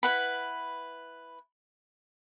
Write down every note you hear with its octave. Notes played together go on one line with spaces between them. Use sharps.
E4 B4 F#5 B5